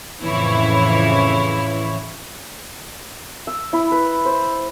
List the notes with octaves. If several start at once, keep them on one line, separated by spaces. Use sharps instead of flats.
F2 A2 C#3 E3 E4 C#5
E6
E4
B4
C5